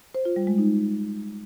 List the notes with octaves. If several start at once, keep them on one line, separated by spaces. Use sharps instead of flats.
C5
F4
G3
G#3
D#4